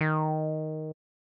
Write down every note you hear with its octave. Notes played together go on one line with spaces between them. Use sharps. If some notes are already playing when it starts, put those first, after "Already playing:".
D#3